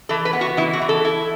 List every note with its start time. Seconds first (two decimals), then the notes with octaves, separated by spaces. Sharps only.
0.09 E3 A4
0.25 B4
0.33 B3
0.41 F#4
0.57 E3 E4
0.73 F#4
0.81 E3
0.89 A4
1.05 E4